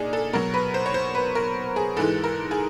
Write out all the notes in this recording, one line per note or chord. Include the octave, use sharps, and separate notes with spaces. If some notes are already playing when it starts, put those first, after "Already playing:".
Already playing: A#2 D4 D#4 G#4
A4
B2 F#3 A#4
B4
C5
C#5
C5
B4
A#4
G#4
G#2 E3 G#3 A4
A#4
G#4